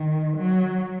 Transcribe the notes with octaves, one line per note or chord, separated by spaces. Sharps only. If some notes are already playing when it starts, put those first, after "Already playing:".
Already playing: D#3
F#3